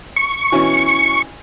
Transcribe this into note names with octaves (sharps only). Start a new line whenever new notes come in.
C#6
B2 E3 C#4